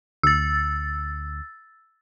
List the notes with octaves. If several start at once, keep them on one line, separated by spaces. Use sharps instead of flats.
D2 E6 A6